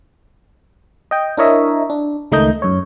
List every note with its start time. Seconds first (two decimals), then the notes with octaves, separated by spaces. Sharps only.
1.11 D#5 G5
1.37 D4 E4 A#4 C#5 D#5 E5
1.90 D4
2.32 C#2 D#3 A3 D#4 D#5 G6
2.62 F#2 C#5